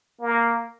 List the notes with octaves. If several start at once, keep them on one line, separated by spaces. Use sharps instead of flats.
A#3